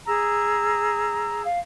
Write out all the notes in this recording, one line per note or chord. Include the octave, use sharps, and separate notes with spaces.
G#4 A#5 E6
F5